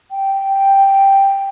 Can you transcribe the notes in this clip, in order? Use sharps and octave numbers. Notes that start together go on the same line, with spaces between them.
G5